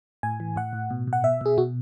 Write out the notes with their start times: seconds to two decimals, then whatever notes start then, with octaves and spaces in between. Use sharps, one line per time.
0.23 A2 G#5
0.40 E3
0.56 A2 F#5
0.73 A2
0.90 B2
1.07 B2
1.13 F#5
1.23 B2 E5
1.41 B2 G#4
1.58 B2 F#4